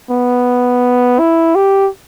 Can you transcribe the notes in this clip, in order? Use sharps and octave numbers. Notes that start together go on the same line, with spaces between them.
B3
E4
G4